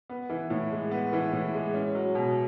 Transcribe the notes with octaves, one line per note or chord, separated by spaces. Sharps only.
B3
E3
A2
G#3
B3
E3
A2
G#3
C#4
F#3
B2